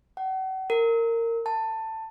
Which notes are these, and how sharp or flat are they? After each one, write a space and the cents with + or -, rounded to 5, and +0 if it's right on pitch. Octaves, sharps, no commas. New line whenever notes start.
F#5 +40
A#4 -20
A5 +15